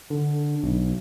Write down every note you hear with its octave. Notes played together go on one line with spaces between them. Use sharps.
D3
B1